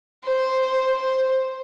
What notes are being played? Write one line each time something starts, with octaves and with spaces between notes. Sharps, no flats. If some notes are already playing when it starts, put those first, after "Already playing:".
C5
C5